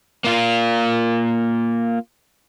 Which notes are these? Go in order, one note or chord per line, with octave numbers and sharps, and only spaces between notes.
A#3 F4